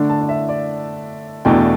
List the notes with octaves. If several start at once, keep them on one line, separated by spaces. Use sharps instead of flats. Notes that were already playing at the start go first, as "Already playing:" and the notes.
Already playing: D3 A3 D4
A5
D5
E5
D5
E2 B2 A3 D4 G5